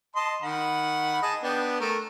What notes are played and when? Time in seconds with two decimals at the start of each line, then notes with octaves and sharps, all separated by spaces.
0.16 D#5 A5 C6
0.42 D#3 F#5 B5
1.22 G#4 D#5 A5
1.43 B3 D4 G5
1.80 A3 A#4